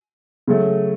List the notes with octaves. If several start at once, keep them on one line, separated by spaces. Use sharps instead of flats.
C#3 F#3 A3